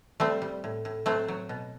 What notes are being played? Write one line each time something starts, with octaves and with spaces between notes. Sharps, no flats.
G3 A3 C4
G3
A2
A2
F#3 A3 C4
F#3
B2